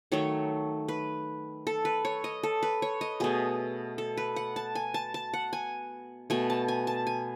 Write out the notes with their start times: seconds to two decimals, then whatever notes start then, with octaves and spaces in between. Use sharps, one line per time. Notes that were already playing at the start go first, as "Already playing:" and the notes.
0.12 D#3 F#3 A3 C#5
0.88 B4
1.67 A4
1.85 B4
2.05 C#5
2.24 D#5
2.43 A4
2.63 B4
2.82 C#5
3.01 D#5
3.20 B2 A3 G#4
3.98 A4
4.17 B4
4.36 F#5
4.56 A5
4.75 G#5
4.94 A5
5.14 A5
5.34 F#5
5.53 G#5
6.30 B2 A3 G#5
6.50 A5
6.68 G#5
6.87 A5
7.07 G#5